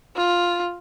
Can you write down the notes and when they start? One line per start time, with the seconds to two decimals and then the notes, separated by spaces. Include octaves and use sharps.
0.16 F4